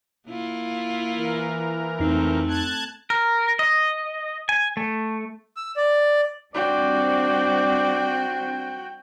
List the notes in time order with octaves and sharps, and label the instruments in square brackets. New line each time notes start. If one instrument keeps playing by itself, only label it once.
[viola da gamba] A#3 E4 F4
[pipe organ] E3 A#4
[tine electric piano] F2 D#4 [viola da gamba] A3 C4
[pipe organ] A5 F#6 G#6
[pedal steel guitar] A#4
D#5
G#5
A3
[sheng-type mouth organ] E6
D5
[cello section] G3 C4 D4 [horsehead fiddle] F#4 G5 [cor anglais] D5